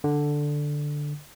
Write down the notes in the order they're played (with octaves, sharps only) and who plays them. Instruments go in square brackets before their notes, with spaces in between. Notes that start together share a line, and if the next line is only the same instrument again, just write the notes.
[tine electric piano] D3